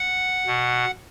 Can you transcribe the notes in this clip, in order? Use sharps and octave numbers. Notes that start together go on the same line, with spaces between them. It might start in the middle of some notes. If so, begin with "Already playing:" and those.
Already playing: F#5
B2